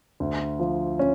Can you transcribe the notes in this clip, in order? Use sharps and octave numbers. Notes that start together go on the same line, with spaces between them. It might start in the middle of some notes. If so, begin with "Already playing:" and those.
D2
F3
C#4